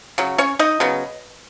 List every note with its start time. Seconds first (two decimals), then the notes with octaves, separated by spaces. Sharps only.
0.18 C#3 F#3
0.38 C#4 C#5
0.59 D#4 D#5
0.80 C#3 F#3 B3